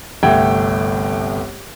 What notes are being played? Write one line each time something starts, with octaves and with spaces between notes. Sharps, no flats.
G1 C2 A3 F#5 G5 G#6